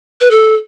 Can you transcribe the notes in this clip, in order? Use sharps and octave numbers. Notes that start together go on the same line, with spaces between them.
B4
A4